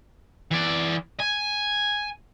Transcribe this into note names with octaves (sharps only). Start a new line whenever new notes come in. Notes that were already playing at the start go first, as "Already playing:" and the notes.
E3 D5
G#5